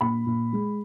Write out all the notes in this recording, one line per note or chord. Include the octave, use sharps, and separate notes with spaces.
A#2 B5
A#2
G#3